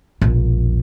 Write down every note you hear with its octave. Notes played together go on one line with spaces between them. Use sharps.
E1 A#1